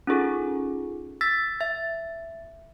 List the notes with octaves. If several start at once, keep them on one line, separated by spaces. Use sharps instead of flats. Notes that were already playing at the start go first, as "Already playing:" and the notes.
C#4 D#4 F4 G#4 A4
E6 A6 B6
E5 A6